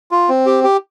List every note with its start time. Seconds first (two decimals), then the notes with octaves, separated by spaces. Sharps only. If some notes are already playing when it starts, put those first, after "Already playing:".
0.11 F4
0.29 C4
0.46 G4
0.64 G4